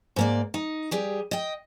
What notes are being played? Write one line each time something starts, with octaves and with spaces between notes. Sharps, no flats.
G#2 A#3 D5
D#4
G3 G4 G#4
D#5 G5